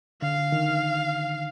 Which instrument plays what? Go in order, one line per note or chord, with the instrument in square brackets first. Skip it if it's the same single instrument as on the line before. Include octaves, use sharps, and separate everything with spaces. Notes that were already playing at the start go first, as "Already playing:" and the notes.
[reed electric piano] D3 [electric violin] F5
[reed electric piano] D#3